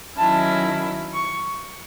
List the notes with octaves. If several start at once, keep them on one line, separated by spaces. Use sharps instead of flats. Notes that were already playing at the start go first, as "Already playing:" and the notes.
D#3 F#3 C#4 E4 A5
C#6